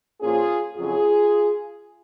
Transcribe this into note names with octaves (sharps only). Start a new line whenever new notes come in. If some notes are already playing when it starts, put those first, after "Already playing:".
A#2 F3 A#3 C#4 F4 G#4
F2 C#3 F#3 C#4 F4 G#4